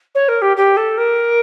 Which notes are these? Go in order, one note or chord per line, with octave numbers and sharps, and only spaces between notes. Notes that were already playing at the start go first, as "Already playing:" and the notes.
C#5
A#4
G4
G4
A4
A#4